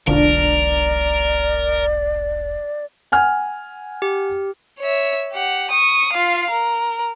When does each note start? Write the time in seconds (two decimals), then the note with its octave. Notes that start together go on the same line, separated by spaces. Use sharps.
0.07 E1 B1 D3 D4 F4 A#4 D5
3.12 F#5 G#5 F6
4.02 G4
4.79 C#5 E5
5.33 G4 F#5
5.71 C#6 D#6
6.13 F4 F5
6.50 A#4